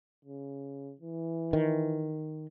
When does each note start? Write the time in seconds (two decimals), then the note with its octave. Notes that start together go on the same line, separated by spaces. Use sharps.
0.25 C#3
1.00 E3
1.53 D#3